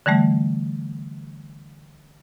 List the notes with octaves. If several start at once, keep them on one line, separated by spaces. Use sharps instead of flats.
D3 E3 G3 A3